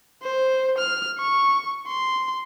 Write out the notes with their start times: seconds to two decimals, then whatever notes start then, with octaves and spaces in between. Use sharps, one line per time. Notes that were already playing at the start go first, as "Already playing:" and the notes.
0.23 C5
0.78 F6
1.19 C#6
1.88 C6